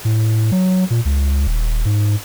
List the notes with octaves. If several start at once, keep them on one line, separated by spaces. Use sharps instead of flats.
A2
F#3
A#2
C#2
D#1
G#2